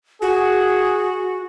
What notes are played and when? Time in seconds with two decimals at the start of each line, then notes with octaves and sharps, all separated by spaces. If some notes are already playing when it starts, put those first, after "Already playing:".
0.22 F#4 G#4